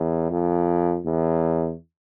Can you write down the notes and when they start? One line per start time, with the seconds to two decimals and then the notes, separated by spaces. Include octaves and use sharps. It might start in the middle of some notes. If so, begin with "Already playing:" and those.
Already playing: E2
0.31 F2
1.06 E2